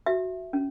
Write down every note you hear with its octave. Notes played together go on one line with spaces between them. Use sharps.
F#4 E5
C#4